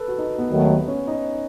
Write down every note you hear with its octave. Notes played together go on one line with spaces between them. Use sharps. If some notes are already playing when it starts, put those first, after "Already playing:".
Already playing: A4 B4
F#4
D#4
B3
D#2 D#3 F#3 A3
C#4
D#4